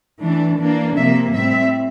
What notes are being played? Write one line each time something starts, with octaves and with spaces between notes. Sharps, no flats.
E3 A3 D4
E3 A#3 D4
C3 F3 A#3 E5
A2 G3 C4 E5